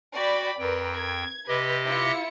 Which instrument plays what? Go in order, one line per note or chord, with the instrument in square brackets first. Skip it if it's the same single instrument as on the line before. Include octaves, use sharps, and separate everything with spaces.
[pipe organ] F#4 [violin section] D5 G5 B5
[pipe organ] F2 G5 [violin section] A#4 B4
[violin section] G#6
[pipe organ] C3 G4 D#5 [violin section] B4
[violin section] E4 F4 C#7